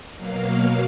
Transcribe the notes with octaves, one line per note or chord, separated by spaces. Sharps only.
B2 F#3 A#3 F5